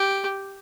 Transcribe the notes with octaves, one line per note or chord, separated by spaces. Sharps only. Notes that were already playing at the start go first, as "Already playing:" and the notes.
Already playing: G4